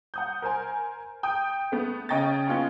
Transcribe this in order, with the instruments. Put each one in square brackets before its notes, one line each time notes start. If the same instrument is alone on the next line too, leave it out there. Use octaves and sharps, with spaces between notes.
[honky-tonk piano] F#5 D#6 G6
A#4 C5 G#5
G5 D#6 G6
A3 B3
C#3 D#5 G5 C#6 A6
B3 C#4 F4 C#5